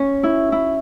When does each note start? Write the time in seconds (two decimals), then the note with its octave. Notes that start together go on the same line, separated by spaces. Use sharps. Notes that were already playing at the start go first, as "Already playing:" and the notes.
Already playing: C#4
0.23 E4
0.52 E4